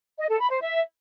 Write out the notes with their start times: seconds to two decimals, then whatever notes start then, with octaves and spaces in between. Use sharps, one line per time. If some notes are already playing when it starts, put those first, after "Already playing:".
0.18 D#5
0.29 A4
0.40 B5
0.50 C5
0.61 E5